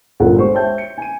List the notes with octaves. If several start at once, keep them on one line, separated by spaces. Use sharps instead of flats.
G1 A#2 A#4 F#5
G#3 G4 C5 C#6
C5 C#5 E5 G5 A5 G6
C#7
G#5 D#7